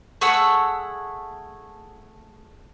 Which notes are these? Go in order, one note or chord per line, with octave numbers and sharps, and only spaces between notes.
A3 G#4 F#5 E6